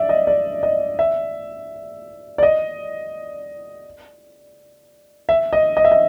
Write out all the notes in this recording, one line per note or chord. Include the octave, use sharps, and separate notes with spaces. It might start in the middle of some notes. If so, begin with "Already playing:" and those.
Already playing: D5 E5
D#5
D5
D#5
E5
D5
D#5
E5
D#5
D#5
E5
D#5